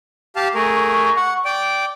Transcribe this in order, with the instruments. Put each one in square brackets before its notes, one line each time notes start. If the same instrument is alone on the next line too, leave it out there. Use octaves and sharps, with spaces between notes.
[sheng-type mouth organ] G4 F5 A5
[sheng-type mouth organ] A3 G#4 A#4 [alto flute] C#6
[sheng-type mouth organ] F#5
D5 G5